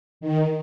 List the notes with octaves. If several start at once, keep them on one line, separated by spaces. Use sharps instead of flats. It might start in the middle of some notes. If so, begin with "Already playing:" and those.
D#3